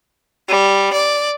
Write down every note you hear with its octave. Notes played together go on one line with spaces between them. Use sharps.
G3
D5